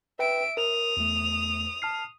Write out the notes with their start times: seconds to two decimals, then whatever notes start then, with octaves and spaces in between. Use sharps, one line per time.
0.19 B4 E5 G5 D7
0.57 A#4 D#6 F7
0.97 E2 A3
1.82 A5 F6 C7